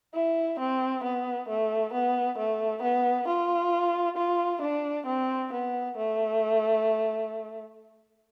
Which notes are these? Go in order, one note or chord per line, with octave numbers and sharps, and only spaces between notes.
E4
C4
B3
A3
B3
A3
B3
F4
F4
D4
C4
B3
A3